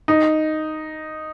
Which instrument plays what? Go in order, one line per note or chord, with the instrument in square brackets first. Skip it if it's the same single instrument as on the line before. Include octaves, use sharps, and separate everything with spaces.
[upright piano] D#4